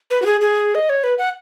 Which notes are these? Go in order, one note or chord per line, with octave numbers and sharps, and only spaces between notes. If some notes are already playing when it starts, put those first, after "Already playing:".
B4
F#4
G#4
G#4
D#5
C#5
B4
F#5